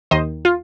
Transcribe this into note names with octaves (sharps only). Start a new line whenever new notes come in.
D#2 D#3 C5 D#5
F4